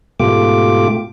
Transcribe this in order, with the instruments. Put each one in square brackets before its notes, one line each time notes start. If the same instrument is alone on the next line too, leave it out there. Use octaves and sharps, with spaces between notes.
[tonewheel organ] G#2 B2 A3 F4 G4 D6